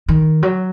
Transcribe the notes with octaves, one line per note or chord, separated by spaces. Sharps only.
D#3
F#3